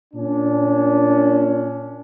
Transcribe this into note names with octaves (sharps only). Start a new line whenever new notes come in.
A#2 C#4 D4